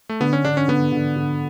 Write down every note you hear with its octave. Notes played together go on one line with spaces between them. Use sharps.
A3
D3 B3
C#4
D3 D4
C#4
D3 B3
D3
D3